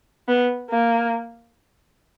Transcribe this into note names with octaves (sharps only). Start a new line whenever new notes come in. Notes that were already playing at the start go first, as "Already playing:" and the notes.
B3
A#3